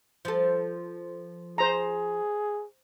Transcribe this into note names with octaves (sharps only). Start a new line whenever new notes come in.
F3 A4
G#4 C5 A#5